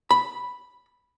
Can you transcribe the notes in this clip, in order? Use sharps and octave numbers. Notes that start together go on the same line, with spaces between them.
B5